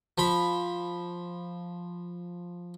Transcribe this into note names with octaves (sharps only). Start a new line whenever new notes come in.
F3 B5